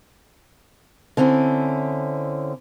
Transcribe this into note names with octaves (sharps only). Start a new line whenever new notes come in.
D3 C4 C#4 E4